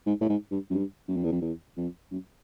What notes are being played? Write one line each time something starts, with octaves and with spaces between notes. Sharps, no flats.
G#2
A2
G#2
G2
F#2
G2
F#2
F2
E2
F2
E2
F2
F#2